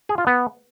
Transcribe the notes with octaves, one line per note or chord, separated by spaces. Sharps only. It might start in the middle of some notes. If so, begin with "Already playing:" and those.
G#4
F4
B3